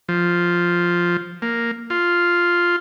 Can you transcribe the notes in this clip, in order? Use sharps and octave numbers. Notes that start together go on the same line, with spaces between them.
F3
A#3
F4